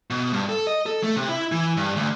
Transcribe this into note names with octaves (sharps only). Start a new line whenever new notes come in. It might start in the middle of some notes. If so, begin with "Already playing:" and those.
B2
G2
A4
D#5
A4
A3
C3
E4
E3
G2
D2